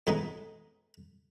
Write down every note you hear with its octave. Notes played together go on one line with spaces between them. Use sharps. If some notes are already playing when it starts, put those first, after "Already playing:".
A2 G#3 B3 D#4